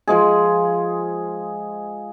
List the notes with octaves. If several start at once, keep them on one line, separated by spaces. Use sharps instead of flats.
F3 G#3 G#4